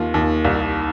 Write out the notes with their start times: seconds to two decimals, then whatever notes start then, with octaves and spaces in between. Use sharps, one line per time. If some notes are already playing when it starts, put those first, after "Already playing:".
Already playing: D#2 F4
0.14 D#2
0.45 C2